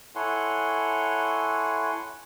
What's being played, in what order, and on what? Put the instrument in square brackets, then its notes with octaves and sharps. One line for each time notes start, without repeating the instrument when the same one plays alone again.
[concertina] E4 A4 C#5 F#5 G#5 C6